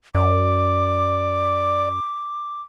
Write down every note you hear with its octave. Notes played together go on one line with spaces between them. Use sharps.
F#2 D5 D6